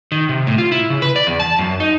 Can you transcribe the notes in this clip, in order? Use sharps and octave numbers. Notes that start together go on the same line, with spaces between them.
D#3
C3
A2
F4
E4
C#3
B4
D5
E2
A5
F#2
D#4